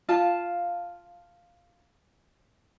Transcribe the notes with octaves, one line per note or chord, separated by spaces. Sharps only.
F4 F5 A5